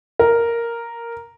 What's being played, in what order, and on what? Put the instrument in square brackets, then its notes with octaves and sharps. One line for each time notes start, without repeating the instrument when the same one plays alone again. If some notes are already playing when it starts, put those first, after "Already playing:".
[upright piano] A#4